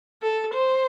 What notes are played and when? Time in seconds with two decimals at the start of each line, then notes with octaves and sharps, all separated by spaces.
0.22 A4
0.55 C5